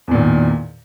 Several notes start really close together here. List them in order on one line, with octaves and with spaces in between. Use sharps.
E2 A#2 D#3